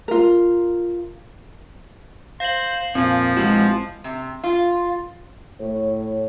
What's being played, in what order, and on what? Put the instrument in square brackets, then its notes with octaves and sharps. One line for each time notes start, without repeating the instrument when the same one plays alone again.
[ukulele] F4 A#4
[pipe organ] C5 [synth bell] F5 F#7
[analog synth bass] F2 [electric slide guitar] A#2 [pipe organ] F3 [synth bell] C4
[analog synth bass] A#1 [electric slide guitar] G#3 E4 F#4
[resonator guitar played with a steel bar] C3
F4
[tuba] A2 [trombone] C#5